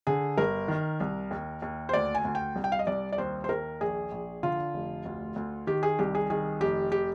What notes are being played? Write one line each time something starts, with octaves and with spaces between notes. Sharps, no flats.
D3 G#4
G1 A#4
D#3
C2
D#2
D#2
C5
D2 D5
G#5
D2
G5
C2
G5
F5
D#5
C2 D5
D5
D#2 C5
C5
D#2 A#4
A#1 G#4
A#1
D3 F4
F1
D2
D2
D#3 G4
G#4
C2 G4
G#4
D#3 G#4
F1 G4
G4